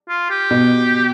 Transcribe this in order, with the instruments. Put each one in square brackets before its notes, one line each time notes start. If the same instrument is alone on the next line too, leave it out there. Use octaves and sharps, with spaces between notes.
[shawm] F4
G4
[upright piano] B2